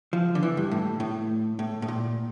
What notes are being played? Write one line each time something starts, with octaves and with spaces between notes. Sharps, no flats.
F3
D3
E3
G2
A2
A2
A2
A2
A#2